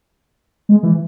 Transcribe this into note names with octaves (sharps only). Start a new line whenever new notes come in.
G#3
E3